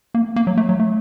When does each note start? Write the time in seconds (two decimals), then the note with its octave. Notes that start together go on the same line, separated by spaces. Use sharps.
0.15 A#3
0.36 A#3
0.47 F#3
0.57 A3
0.69 F#3
0.80 A3